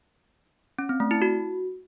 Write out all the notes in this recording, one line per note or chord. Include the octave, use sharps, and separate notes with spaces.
C#4
C4
A3
E4
F#4